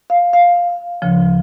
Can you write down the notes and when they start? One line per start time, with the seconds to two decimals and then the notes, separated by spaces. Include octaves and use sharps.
0.10 F5
0.33 F5
1.02 D2 C#3 F3